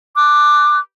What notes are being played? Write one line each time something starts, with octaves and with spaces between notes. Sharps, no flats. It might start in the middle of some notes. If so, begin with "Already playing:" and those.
D6 F#6